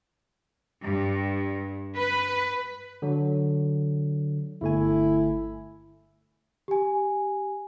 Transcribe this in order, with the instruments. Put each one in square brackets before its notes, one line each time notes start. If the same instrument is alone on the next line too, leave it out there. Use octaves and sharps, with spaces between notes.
[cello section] G2
B4
[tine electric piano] D3 F#3
[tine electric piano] G1 A3 G#5 [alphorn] E4
[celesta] G4 G#5